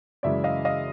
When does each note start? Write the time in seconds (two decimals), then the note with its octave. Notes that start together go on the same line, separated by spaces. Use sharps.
0.23 F#2 C#3 E3 G#3 D5 E5
0.44 D#5 F5
0.65 D#5 F5